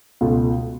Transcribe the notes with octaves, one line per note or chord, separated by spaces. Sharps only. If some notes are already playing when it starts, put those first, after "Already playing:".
C#2 B2 A3 F4